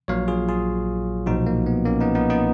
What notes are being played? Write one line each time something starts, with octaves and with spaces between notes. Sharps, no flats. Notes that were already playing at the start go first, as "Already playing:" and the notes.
A#1 A#2 F#3 C#5 F5
F4 G#4
F4 G#4
B1 A#2 F3 D#4 F#4
A#3
B3
A#3 C#4
B3 D#4
B3 D#4
B3 D#4